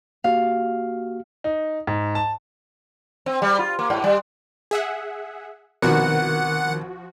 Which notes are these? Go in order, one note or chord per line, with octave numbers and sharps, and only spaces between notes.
A#3 F#4 G4 F5
D#4
G#2
A5
C4
G3
F4
A#3
G#2
G3
G#4 E5 F#5
C2 B2 D#3 F3 F#4 A#4 F#5